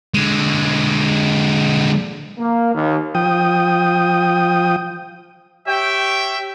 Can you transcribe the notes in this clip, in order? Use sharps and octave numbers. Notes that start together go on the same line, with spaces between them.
D3 G#3
A#3
D#2
F3 G5 D#6
G4 C#5 E5 G5